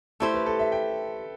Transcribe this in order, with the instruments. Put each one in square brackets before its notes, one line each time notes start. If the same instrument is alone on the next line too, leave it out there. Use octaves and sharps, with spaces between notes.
[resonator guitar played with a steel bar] A3 E4 G4 C5 [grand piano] A4
[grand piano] B4
A4
E5
G5